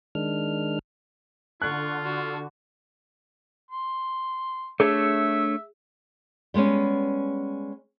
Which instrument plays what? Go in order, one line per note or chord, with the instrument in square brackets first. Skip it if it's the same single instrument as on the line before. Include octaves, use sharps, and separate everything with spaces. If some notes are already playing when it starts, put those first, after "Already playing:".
[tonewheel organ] D#3 G#3 D4 F6
[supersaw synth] D3 [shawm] F4 [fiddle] C#6 [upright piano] F#6
[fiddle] F#4
[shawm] C6
[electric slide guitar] A3 D4 C#5 [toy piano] G#4 [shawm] E5
[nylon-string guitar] G3 G#3 B3 C#4